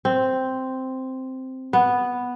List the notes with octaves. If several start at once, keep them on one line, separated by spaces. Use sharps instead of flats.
C4
B3